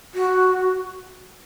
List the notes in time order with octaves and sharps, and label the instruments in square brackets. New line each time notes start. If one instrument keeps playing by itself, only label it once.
[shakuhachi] F#4